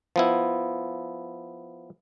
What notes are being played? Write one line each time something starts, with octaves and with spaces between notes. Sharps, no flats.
F3 B3 E4